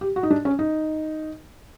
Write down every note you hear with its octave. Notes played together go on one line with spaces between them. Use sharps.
G4
F#4
D#4
D4
C#4
D#4